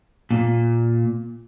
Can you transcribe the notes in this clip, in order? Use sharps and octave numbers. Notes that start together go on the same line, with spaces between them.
A#2